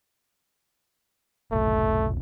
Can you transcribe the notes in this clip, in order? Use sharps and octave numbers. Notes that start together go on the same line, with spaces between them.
F1 B1 A3